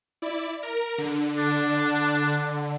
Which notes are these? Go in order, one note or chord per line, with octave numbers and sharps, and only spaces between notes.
E4 D5
A#4
D3
D4